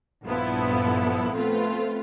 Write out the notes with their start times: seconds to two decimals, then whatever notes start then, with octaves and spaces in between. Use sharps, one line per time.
0.24 A#1 G2 F3 B3 E4 A4
1.34 A3 B3 C4 F4 B4